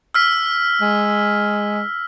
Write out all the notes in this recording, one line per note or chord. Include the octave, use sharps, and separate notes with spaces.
E6 F6 B6
G#3